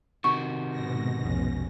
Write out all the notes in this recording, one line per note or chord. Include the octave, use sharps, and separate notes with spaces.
C3 D#3 F#4 C#6
G#2 B2 A#6
F1 B1 C#4